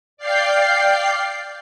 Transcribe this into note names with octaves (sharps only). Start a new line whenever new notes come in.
D5 F5 G5 C7